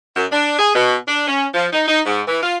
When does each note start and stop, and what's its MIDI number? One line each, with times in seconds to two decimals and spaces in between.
0.15 0.25 42
0.31 0.58 62
0.58 0.72 68
0.74 0.94 47
1.07 1.26 62
1.28 1.45 61
1.54 1.66 53
1.73 1.83 63
1.87 2.00 63
2.06 2.21 44
2.28 2.42 52
2.43 2.56 65